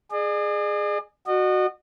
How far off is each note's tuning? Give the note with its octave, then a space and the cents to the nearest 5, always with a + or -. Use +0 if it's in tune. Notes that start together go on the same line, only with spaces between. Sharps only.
G#4 +0 D5 +45
F#4 +0 D#5 -35